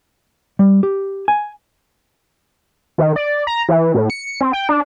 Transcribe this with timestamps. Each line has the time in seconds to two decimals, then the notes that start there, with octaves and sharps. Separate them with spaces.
0.59 G3
0.83 G4
1.28 G#5
2.98 D#3
3.16 D5
3.47 A#5
3.69 E3
3.94 A2
4.10 C#7
4.41 C4
4.53 G5
4.69 D4